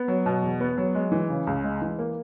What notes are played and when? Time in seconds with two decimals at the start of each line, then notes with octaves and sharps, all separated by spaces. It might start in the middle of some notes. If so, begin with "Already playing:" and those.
Already playing: B3
0.08 F#3
0.26 B2
0.42 E2
0.60 B3
0.78 F#3
0.95 G#3
1.12 E3
1.29 C#3
1.47 C#2
1.64 G#3
1.82 E3
1.99 A#3